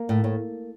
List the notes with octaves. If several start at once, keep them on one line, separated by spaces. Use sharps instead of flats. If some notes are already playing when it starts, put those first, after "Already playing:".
Already playing: A#3
A2
A2